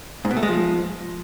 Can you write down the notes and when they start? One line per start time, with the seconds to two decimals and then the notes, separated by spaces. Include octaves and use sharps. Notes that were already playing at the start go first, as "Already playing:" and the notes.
0.25 G#2
0.31 B2
0.37 A3
0.43 G#3
0.49 F3